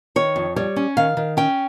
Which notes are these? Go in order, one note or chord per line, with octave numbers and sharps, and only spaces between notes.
D#3 C#5
F2
G3 C#5
C#4
D#3 F5
D#3
C#4 G5